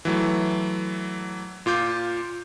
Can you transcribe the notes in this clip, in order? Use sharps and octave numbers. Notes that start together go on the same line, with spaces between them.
E3 F#3 A3
A#2 F4 D6 G6